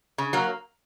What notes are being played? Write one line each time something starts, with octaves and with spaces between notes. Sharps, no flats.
C#3
F#3 A#3